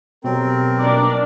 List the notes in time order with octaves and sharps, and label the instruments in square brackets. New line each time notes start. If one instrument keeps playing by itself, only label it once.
[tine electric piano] B2 F#3 [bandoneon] C4 [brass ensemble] G4 A4 A#4
[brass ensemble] A#3 D#4 A#4 [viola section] D4 D5